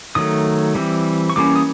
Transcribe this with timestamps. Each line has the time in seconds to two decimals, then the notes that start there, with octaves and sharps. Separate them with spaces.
0.15 D#3 F#3 A3 D#6
0.75 E3 G3 C4
1.30 C#6
1.36 E3 G3 A#3 C#4 D6
1.56 D#6